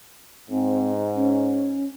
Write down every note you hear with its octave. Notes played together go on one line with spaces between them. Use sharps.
G#2 C4
C#4